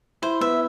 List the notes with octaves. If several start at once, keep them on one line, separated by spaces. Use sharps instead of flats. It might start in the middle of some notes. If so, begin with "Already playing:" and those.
E4 C5
B3 E5